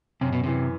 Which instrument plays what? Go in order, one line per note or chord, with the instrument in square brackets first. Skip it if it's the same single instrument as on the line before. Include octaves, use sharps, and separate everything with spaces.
[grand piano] F#2 [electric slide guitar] C3
[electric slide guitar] B2
[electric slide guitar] C3 [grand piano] E3